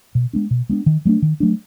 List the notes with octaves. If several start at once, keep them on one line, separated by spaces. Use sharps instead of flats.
B2
G#3 B3 D4
B2
G#3 B3 D4
D#3
F#3 A3 D4
D#3
F#3 A3 D4